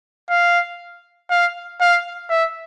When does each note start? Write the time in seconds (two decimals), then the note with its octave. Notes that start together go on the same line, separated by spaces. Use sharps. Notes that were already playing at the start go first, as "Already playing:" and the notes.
0.30 F5
1.31 F5
1.81 F5
2.30 E5